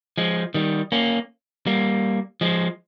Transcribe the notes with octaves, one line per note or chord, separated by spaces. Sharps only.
F3 G#3
D#3 G3
A#3 C#4
G3 A#3
F3 G#3